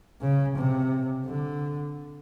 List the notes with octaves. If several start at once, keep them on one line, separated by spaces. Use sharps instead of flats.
C#3
C3
D3